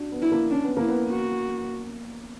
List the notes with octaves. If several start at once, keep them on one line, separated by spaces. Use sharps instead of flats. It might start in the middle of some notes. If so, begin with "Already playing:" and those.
Already playing: D4 F#4
B3
E4
A#3
C#4 D4
B3
A#3 E4
B3
F#4